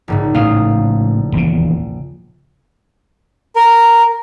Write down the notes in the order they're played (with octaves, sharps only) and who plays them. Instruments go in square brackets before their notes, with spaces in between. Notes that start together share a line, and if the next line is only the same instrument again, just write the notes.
[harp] A#1 G#2 C#3
[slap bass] A2 C#3 A3 [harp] F5 D#6
[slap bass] D#1 E2 C#3
[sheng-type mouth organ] A#4